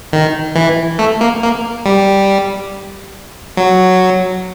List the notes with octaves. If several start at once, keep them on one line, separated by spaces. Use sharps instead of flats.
D#3
E3
A3
A#3
A#3
G3
F#3